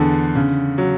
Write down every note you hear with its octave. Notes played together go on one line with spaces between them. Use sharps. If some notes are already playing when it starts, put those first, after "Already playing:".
Already playing: E2 D3 G#4 A4
C#3
F#3